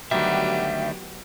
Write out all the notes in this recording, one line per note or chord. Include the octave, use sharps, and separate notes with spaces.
D2 D#3 F#3 G3 B3 G4 E5